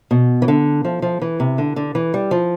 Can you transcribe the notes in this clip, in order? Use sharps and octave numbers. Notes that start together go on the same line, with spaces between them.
B2
E3
D3
F3
F3
E3
C3
D3
D3
E3
G3
F3